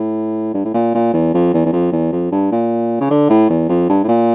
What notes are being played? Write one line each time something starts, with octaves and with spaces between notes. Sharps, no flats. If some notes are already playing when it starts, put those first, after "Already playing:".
Already playing: A2
G2
A2
A#2
A#2
E2
F2
E2
E2
F2
E2
F2
G2
A#2
C#3
D3
A2
E2
F2
G2
A2
A#2